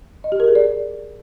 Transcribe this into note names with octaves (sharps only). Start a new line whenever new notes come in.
D#5
G4
A#4
G#4
D5